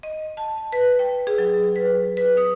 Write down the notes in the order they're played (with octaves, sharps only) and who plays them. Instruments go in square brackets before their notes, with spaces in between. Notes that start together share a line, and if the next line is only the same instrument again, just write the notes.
[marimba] D#5
A5
B4
G5
G#4
F#3
B4
B4
D#6